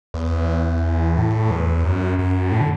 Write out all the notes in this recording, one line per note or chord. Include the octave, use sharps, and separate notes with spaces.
E2
A2
E2
F#2
F#2
A2
D3